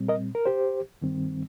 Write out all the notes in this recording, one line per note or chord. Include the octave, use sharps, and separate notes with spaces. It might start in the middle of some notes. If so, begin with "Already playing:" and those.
Already playing: A#2 G3 C4
A#4 D#5
A#4
G4 C5
G2 D#3 G3 C4